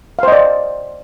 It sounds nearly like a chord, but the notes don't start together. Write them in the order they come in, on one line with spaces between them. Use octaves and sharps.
F5 C5 D#5 D5